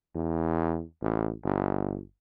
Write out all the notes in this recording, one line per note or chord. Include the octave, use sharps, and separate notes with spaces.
E2
A1
G1